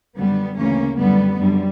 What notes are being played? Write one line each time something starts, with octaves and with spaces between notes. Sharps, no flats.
F#2 D3 G3 B3
D2 C#3 E3 A#3 C#4
F#2 D3 G3 B3
F#2 D3 G3